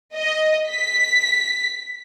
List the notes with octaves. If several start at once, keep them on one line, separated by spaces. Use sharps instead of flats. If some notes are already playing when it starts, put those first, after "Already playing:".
D#5
B6